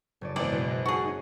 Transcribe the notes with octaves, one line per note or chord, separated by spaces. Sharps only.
F#1 C#4 D5
G#1 E3 B3 G#4 D5
B2 B4 C5
F#6 A#6
F#4 G#4
C#4 D#4